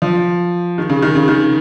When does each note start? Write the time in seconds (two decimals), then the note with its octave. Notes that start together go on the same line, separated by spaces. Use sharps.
0.02 F3
0.78 D#3
0.90 C#3
1.02 D#3
1.15 C#3
1.28 D#3